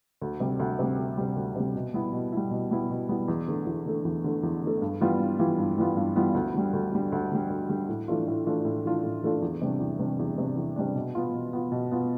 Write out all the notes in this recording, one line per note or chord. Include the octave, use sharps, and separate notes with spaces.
D2
C3 G3
D2
C3 G3
D2
C3 G3
D2
C3 G3
B2
G3 B3 E4
B2
G3 B3 E4
B2
G3 B3 E4
B2
G3 B3 E4
E2
D3 A3
E2
D3 A3
E2
D3 A3
E2
D3 A3
G2
E3 G3 B3 F4
G2
E3 G3 B3 F4
G2
E3 G3 B3 F4
G2
E3 G3 B3 F4
D2
D3 G3
D2
D3 G3
D2
D3 G3
D2
D3 G3
A2
E3 A3 D4 F4
A2
E3 A3 D4 F4
A2
E3 A3 D4 F4
A2
E3 A3 D4 F4
E2
C3 G3 D4
E2
C3 G3 D4
E2
C3 G3 D4
E2
C3 G3 D4
B2
B3 F4
B2
B3 F4
B2
B3 F4